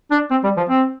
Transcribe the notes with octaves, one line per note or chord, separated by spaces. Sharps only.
D4
C4
G3
F3
C4